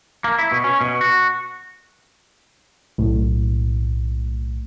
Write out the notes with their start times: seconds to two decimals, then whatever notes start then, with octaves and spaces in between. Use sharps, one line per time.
0.24 A#3
0.39 E4
0.52 B2
0.64 C#4
0.81 B2
1.01 F#4
2.98 B1 A2